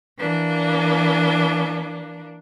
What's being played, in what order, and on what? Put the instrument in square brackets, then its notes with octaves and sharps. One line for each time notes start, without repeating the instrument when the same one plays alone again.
[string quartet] E3 A#3 D4